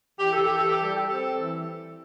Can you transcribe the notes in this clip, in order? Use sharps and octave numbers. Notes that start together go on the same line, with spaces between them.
E3 G4
A4
E3 G4
A4
G4
G3 A4
G4
C4 A4
E3